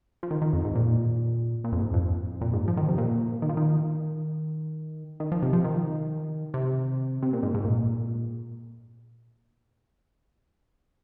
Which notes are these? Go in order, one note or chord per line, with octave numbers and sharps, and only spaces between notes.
F3
D#3
D#3
F2
G#2
A#2
A#2
F2
G#2
F2
A#2
G#2
F3
D#3
C3
A#2
D#3
F3
D#3
D#3
F3
C3
F3
D#3
C3
C3
A#2
G#2
G#2
A#2